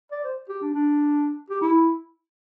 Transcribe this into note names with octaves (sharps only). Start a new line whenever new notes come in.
D5
C5
G4
D4
D4
G4
E4